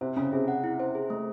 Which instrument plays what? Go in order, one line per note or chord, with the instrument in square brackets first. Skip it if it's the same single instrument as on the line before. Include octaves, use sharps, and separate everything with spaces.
[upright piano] C3 [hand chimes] C5
[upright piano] C#3 [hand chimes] C#4
[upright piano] C3 [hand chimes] G#4
[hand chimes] F#5
E4
C5
G#4
A3